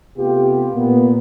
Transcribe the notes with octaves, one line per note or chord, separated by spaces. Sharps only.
C3 A3 B3 F4 G4
A#2 A#3 B3